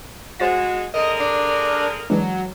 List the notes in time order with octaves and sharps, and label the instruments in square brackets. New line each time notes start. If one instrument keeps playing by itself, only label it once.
[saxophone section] G#3 F#4 [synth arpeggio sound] C5 A6
[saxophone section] D3 G#4 A#4 [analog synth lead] D#5
[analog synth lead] D4
[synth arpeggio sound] E3 G#3 D4 [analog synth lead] F#3